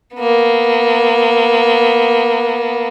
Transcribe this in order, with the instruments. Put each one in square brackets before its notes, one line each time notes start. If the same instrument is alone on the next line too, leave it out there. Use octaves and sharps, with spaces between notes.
[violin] A#3 B3